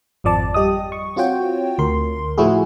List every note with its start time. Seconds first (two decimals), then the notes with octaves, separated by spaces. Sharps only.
0.24 G#1 F2 F3 D5 A5
0.54 G3 G4 D#5 D#6
0.92 C#6
1.16 C4 F4 F#4 C#5 G5
1.79 D2 A#4 C6
2.38 A2 F3 A3 E4 F#4 G#4